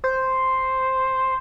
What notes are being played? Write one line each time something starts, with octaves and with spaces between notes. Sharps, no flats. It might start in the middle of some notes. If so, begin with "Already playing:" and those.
C5